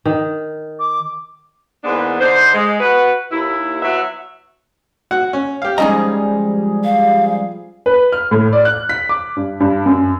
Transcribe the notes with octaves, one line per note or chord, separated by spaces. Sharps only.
D#3
D6
E2 G#2 A#3 B3 D4
D3 D#4 C5
G#3
F#4 B4
D#2 E4
F#3 B3 E5
F#4 F#5
C#4
G4 F5
F3 G3 G#3 C#4 D#4 G#4 A#5
F5
B4
F6
A2
D5
F#6
B6
D6
G2
G2
F#2